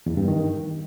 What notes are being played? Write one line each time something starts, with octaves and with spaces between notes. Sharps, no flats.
E2
G2
D#3